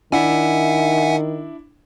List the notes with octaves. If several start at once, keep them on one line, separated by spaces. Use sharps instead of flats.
D#3 D4 E4 E5 F#5 G#5